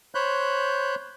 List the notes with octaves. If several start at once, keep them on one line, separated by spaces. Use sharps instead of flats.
C5 C#5 B5 F#6 G6